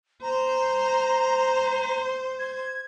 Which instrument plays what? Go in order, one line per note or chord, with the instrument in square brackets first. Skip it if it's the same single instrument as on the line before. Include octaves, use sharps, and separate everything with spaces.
[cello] C5 [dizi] A#5
[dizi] G#6